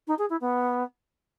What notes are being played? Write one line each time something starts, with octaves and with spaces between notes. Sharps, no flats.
D#4
G#4
E4
B3